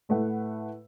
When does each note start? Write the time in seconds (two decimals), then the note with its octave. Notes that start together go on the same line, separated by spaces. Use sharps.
0.09 A2 A3 B4 F#5